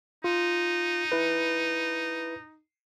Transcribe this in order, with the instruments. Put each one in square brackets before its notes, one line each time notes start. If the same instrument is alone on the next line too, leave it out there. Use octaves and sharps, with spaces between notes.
[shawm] D#4 [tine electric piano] F4
[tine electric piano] E4 B4